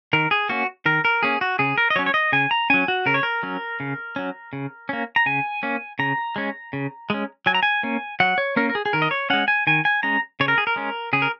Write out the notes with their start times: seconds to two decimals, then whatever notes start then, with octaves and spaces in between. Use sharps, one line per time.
0.13 D#3 A#4
0.31 G#4
0.49 A#3 C#4 F#4
0.86 D#3 A#4
1.05 A#4
1.23 A#3 C#4 G#4
1.41 F#4
1.59 C#3 G#4
1.78 A#4
1.90 D#5
1.96 F#3 C#5
1.99 C#4
2.06 C#5
2.14 D#5
2.32 C#3 G#5
2.51 A#5
2.70 F#3 C#4 G#5
2.88 F#4
3.06 C#3 A#4
3.14 C#5
3.23 A#4
3.43 F#3 C#4
3.80 C#3
4.16 F#3 C#4
4.53 C#3
4.89 A#3 C#4
5.16 A#5
5.26 C#3 G#5
5.63 A#3 C#4
5.99 C#3 A#5
6.36 G#3 C#4
6.73 C#3
7.10 G#3 C#4
7.46 F#3 G#5
7.55 A#5
7.63 G#5
7.83 A#3 C#4
8.20 F#3 F#5
8.38 C#5
8.56 A#3 C#4 A#4
8.70 A#4
8.75 G#4
8.86 G#4
8.93 D#3 A#4
9.02 D#5
9.11 C#5
9.30 G#3 C#4 F#5
9.48 G#5
9.67 D#3 G#5
9.85 G#5
10.03 G#3 C#4 A#5
10.40 C#3 C#5
10.48 A#4
10.58 G#4
10.67 A#4
10.76 G#3 C#4
11.13 C#3 G#4
11.22 A#4